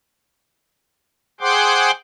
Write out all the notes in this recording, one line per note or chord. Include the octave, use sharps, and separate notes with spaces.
G#4 C5 F#5 G5 C6 D6